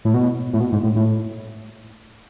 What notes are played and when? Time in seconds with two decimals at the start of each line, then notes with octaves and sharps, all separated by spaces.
0.05 A2
0.14 B2
0.53 A2
0.60 B2
0.72 G#2
0.83 A2
0.95 A2